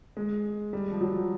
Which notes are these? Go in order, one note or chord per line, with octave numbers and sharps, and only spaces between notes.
G#3
G3
F3
F#3